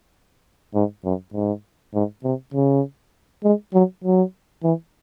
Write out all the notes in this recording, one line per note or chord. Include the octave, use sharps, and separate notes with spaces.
G#2
F#2
G#2
G#2
C3
C#3
G#3
F#3
F#3
E3